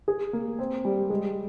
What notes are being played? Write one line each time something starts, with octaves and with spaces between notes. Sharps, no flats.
G#4
A#3
C4
G3
G#3